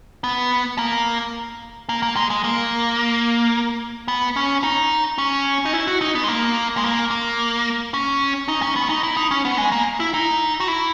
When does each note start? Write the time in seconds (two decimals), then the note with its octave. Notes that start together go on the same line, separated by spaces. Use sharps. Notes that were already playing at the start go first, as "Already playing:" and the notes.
0.24 B3
0.78 A#3
1.89 A#3
2.02 A#3
2.16 G#3
2.30 G#3
2.44 A#3
4.08 B3
4.36 C#4
4.64 D#4
5.18 C#4
5.65 D#4
5.74 E4
5.88 F#4
6.01 D#4
6.15 B3
6.24 G#3
6.28 A#3
6.77 G#3
6.84 A#3
7.11 A#3
7.94 C#4
8.48 D#4
8.62 C#4
8.76 B3
8.89 D#4
9.03 E4
9.17 D#4
9.31 C#4
9.45 B3
9.58 G#3
9.72 A#3
10.00 E4
10.14 D#4
10.60 F#4
10.68 E4